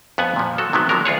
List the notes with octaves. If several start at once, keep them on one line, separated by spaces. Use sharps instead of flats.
F2 B3 F#5 G#5
A#2 F3
F#3 F#4 A4
C3 D#3 F3 F#3 G#3 B3
D3 F3 F#3 G#3 A#4
D2 F4 G#4 C#5